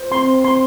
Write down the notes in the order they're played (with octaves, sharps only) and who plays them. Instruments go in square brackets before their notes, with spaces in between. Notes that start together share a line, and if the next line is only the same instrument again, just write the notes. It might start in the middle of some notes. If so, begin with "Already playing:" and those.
Already playing: [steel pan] C5
[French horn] C4 [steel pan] C6
[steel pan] C6